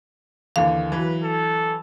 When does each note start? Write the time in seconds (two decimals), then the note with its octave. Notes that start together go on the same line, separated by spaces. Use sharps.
0.56 D#2 D3 E3 F5
0.92 E3 F#3 B4
1.23 A4